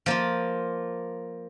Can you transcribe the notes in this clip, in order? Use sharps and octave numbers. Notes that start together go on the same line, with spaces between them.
F3 A#3 F4